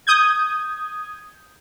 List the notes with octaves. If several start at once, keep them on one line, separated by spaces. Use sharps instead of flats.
D#6 G6 G#6